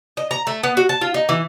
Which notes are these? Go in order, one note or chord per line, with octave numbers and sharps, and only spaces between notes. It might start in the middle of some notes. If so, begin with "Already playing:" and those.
D#5
A#5
A3
B3
F#4
A5
F4
D#4
E3